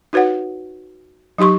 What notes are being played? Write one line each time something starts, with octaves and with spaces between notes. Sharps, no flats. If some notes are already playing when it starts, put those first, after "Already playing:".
D#4 F#4 B4 C#5 F#5
F#3 D#4 G4 C6 C#6